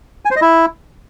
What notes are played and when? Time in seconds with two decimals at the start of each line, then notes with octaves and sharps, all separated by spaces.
0.25 G#5
0.31 C5
0.36 D#5
0.41 E4